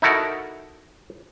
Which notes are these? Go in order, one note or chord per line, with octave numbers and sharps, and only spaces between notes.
D#4 E4 F#4 A4 A#4